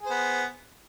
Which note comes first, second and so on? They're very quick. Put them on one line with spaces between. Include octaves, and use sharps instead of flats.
G#4 C5 B3